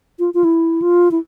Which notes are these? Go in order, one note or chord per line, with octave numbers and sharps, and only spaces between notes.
F4
F4
E4
F4
E4